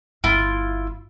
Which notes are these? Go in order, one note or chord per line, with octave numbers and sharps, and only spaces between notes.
G1 E4 F4